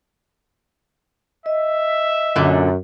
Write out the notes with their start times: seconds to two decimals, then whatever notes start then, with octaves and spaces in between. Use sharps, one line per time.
1.46 D#5 E5
2.36 F#2 A#2 D3